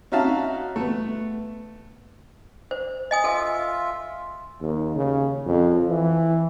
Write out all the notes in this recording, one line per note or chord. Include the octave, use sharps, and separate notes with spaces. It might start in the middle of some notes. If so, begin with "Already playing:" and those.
C#4 D#4 F#4 E5 F5 A5
A3 B3
C5
D#5 G#5 D#6
F4 A4 E5 G#5
D#2
C#3
F2
E3